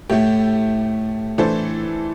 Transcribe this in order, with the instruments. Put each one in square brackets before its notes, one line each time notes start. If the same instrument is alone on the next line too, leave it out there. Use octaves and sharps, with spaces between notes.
[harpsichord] A2 [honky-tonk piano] A3 E4 G4
[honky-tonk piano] E3 A3 D4 A4 C5